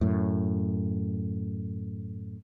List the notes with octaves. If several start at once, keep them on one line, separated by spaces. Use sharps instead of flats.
F#2 A2